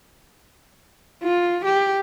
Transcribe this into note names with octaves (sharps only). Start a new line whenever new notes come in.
F4
G4